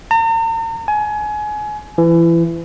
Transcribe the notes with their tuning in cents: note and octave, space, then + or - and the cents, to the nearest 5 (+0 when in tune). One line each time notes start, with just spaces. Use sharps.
A#5 -45
G#5 +25
E3 +25